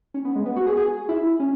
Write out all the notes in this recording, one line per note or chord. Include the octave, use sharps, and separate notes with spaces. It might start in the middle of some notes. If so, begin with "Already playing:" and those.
C#4
B3
G#3
B3
F#4
G#4
G#4
E4
C#4